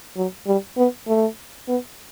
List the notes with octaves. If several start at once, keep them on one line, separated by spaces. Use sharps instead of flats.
F#3
G3
B3
A3
B3